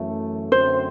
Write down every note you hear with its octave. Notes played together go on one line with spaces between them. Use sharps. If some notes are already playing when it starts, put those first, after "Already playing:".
Already playing: F#2 E3 A3
F#2 D3 A3 C4 C5